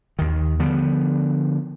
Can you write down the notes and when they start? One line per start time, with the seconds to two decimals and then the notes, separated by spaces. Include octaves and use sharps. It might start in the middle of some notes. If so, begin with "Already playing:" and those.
0.19 D#2 D#3
0.59 D3 F3 G3 B3